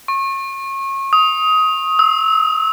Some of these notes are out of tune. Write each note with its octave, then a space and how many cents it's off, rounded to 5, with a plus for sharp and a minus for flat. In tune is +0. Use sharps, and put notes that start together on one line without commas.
C#6 -30
D#6 +20
E6 -25